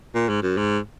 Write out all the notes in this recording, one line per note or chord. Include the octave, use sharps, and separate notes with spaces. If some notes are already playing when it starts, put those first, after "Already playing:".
A#2
G#2
F#2
G#2